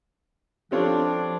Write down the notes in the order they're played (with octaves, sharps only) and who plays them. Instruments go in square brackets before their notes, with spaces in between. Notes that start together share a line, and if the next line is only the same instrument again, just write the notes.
[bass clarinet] F3 [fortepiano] C4 F4 C#5 [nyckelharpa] D4 [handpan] G4 A4 C5